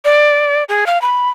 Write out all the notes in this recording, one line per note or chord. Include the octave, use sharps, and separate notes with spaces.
D5
G#4
F5
B5